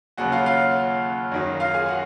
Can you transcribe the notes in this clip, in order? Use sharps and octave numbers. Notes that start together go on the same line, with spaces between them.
D#2 C#3 F#3 F#4 F#5
F4 F5
F4 F5
F#2 D#3 F#3
F4 F5
G#4 G#5
F#4 F#5